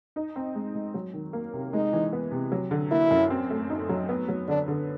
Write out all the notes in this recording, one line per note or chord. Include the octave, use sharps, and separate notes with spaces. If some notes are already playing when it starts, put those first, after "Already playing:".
D#4
C4
G#3
G#3
F#3
D#3
A#3
C3
G#3 D#4
E3
B3
C3
F#3
D3
A#3 E4
F#2
C4
A3
D#4
F#3
B3
F#3
D3 D4
D3